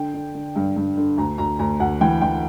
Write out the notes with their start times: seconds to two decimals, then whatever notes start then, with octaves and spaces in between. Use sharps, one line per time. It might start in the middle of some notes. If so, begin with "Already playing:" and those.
Already playing: D3 G5
0.14 D3
0.35 D3
0.56 G2
0.76 G2
0.97 D3
1.18 D2 A#5
1.38 D2 A#5
1.59 D2 A#5
1.80 D2 F#5
2.01 E3 G5
2.21 E3 G5